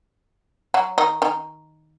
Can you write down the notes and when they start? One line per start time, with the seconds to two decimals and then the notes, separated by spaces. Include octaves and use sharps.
0.74 F#3 F#4
0.98 D#3 D#4
1.22 D#3 D#4